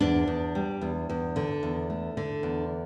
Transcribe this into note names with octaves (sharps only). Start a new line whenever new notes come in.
E2 D4
E2
G3
E2
E2
D3
E2
A3
D3
E2